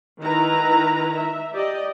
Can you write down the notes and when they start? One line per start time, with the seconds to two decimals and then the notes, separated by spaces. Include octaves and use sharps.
0.20 D#3 E4 B4 A#5
1.16 E5
1.53 G4 D5 D#5